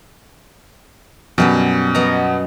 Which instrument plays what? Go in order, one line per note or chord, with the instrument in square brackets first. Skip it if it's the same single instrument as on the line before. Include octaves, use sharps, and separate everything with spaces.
[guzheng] F#2 G3 B4 [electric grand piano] B2
[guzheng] B3 D#5 A#5